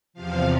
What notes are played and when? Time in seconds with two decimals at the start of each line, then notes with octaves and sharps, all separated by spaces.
0.13 E2 C3 F3 F5